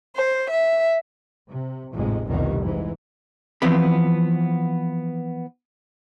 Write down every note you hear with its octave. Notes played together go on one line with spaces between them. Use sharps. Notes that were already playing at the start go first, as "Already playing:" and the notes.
C5
E5
C3
A1 F2 G#2 C3 G#3
F1 C2 F2 B2 D#3 G3
G#2 E3
E3 F3 B3 C4 B5